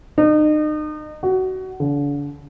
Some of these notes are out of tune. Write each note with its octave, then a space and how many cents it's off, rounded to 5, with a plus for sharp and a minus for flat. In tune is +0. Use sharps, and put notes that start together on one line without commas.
D#4 -35
F#4 +20
D3 -40